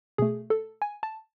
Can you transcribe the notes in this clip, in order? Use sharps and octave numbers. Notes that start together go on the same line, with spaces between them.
B2 A3 G#4
A4
G#5
A5